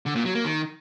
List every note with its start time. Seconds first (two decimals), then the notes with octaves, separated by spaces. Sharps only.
0.06 D3
0.16 A#2
0.25 F#3
0.35 A#3
0.45 D#3